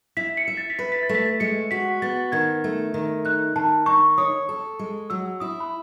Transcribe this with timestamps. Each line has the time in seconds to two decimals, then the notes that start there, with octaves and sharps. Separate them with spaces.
0.17 E4 B6
0.37 C#7
0.48 E5
0.57 A6
0.70 B6
0.79 B4 A6
0.92 B6
1.03 A6
1.09 A3
1.15 B6
1.26 A6
1.40 G#3 C#7
1.71 F#4 B6
2.02 B3 A6
2.32 D#3 G#6
2.64 A3
2.94 D#3
3.25 D#4 F#6
3.56 D#3 A5
3.86 D#4 C#6
4.18 C#5 D#6
4.49 A4
4.79 G#3
5.10 F#3 E6
5.40 E4 D#6
5.60 B5